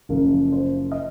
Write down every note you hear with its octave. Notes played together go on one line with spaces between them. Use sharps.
F#1 F#2 C#3 F3 A#4
C5
D#5